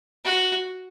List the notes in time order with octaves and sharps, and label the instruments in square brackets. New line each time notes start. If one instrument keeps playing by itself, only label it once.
[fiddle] F#4